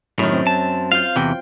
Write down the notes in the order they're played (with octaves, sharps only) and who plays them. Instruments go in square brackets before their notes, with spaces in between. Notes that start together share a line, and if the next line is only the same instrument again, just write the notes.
[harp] F#2 [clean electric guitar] A2 D#3
[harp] C4
[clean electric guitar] A5
[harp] F4 G6 [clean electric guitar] F5
[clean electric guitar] E2 C3 E3 [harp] G5